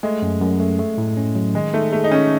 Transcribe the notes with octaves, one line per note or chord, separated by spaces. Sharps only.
G#3 A3
F#2
F#2
A3
A3
A2
C#4
F#3
D#3 G#3
A3 D#4
A3 G#4
D#4
D#3 C#4